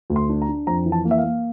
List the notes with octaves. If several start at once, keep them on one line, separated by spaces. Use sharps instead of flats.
D2
C6
D4
A#5
D4
F2 A#5
E3
A5
A#3
E5
F5
A#3